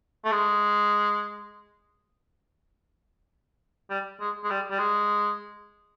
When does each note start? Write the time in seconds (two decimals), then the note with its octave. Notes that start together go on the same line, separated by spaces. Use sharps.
0.25 A3
0.32 G#3
3.90 G3
4.20 G#3
4.44 G#3
4.50 G3
4.70 G3
4.79 G#3